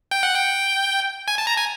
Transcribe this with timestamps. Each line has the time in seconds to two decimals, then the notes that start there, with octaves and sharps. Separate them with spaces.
0.11 G5
0.23 F#5
0.34 G5
1.28 G#5
1.38 A5
1.47 A#5
1.57 G#5